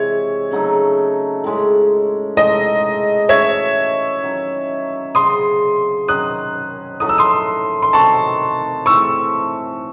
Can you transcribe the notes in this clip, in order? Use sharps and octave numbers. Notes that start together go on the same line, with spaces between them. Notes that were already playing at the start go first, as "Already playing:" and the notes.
Already playing: C3 E3 G#3 C#5 E5
C#3 F#3 A3 D#4
A2 G#3 C#4
A2 G#3 D#4 G#4 D#5
E3 A3 C#4 F#4 C#5 E5
D#3 F#3 C#4 E4
C#3 F#3 C4 C6 D#6
D#3 F#3 C#4 D#6 F#6
A2 F#3 A3 D#4 D#6
E6
C6 D#6
C6
D#3 A3 C4 F#4 A5 C#6
A2 E3 A3 C4 C#6 E6